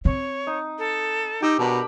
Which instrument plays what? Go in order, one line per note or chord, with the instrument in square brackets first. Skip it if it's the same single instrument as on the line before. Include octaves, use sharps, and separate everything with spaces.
[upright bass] C4 [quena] C#5
[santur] D#4
[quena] A4
[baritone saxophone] D#4 [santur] G4 G5 E6
[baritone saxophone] B2 [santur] D4 A#4 B5 [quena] A#5